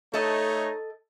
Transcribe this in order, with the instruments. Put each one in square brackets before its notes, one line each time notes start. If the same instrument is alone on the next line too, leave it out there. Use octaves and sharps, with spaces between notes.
[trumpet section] A3 D#4 C#5 [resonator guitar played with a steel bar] A4 D#5